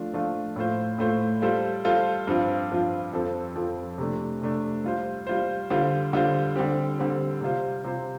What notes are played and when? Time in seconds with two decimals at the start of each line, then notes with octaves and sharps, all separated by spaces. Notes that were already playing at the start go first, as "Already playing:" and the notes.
Already playing: F3 A3 D4 F4
0.13 F3 A3 D4 F4
0.56 A2 A3 F4 C5
0.98 A2 A3 F4 C5
1.42 G3 F4 A4 C5
1.85 G3 F4 A4 C5
2.27 G2 F3 C4 F4
2.71 G2 F3 C4 F4
3.13 F2 F3 C4 A4
3.55 F2 F3 C4 A4
3.98 C3 A3 D4
4.42 C3 A3 D4
4.84 G3 F4 C5
5.27 G3 F4 C5
5.70 D3 G3 F4 C5
6.13 D3 G3 F4 C5
6.56 D3 G3 C4 G4
6.99 D3 G3 C4 G4
7.41 C3 G3 F4 C5
7.85 C3 G3 F4 C5